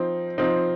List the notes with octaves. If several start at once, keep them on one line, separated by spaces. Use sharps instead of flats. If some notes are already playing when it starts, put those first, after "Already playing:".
Already playing: F3 C4 D#4
F3 C4 D#4